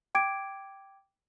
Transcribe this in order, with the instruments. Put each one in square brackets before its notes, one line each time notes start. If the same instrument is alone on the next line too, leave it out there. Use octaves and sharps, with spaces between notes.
[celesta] G5 D6 G#6 D7